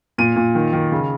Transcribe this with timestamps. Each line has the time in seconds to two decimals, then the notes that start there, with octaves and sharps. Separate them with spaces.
0.18 A#2 D#7
0.36 A#2
0.55 D#3
0.73 D#3
0.92 C#3